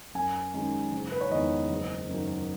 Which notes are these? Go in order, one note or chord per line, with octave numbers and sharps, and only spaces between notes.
F#2 G#5
D#3 G#3 C#4
F#1
B4
C#5
E2 D#3 G#3 B3 D#5
F#1
F#2 D#3 F#3